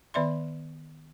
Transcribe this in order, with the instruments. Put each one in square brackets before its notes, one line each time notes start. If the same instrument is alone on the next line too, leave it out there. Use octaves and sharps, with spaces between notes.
[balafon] D#3 B3 D5 E5 C6